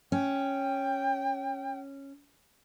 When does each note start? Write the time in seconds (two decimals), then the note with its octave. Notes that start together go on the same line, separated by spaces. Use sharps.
0.12 C#4 G5